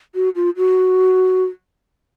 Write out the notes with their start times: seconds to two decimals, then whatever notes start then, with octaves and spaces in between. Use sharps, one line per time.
0.15 F#4
0.35 F4
0.57 F#4